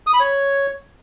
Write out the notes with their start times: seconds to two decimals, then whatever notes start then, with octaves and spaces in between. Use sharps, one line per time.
0.07 D#6
0.13 B5
0.20 C#5